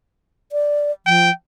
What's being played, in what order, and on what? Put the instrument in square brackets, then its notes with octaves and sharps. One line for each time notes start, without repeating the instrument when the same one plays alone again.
[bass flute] D5
[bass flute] F3 [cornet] G5